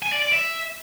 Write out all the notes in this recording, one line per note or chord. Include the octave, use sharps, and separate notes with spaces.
G#5
D5
D5
E5